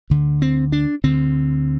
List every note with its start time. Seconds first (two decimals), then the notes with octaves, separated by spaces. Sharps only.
0.10 D2 D3
0.42 C4
0.72 D4
1.04 D2 D3 C4